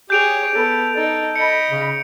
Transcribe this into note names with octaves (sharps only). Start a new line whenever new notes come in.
G4 G#4 C#5 G6 D7 F7
B3 A4
D#4 A4
D#5 B5 C#7
C#3